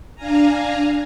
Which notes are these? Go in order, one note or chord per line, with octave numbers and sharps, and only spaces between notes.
D4 F5 G#5 A#5